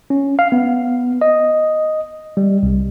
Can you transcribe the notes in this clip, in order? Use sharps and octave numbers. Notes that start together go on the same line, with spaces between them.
C#4
F5
B3
D#5
G3
C2